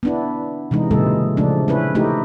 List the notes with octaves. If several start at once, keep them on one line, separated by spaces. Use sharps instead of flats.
B3 D4 E4
C3 E3 G#3 D#4
A#2 C#3 E3 G#3 A4
C#3 F3 A3 D4
C#4 E4 B4
A3 D#4 E4 G4